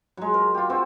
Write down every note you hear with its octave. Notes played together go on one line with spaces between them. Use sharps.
F#3 G#3
A#4
F4 G4
C4 F#4 G4 C5